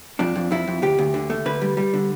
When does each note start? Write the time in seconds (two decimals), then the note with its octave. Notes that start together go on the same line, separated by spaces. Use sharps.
0.19 F2 D4
0.36 F2
0.51 F2 E4
0.68 F2
0.82 D2 G4
0.99 D2
1.14 D3
1.30 A3
1.46 D3 B4
1.62 G3
1.77 G3
1.94 D3